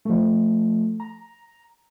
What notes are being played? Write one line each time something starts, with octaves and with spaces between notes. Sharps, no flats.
F3 A3
A#5